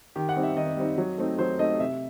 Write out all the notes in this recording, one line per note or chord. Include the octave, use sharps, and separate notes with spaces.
D#3 G4
F#5
G3 C4 D#4
E5
D#3 D#5
G3 C4 D#4
F#3
A3 C4 D#4
F#3 C5
A3 C4 D#4 D#5
C3 E5